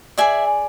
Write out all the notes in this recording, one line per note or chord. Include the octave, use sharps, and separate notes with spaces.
G#4 D5 E5 G#5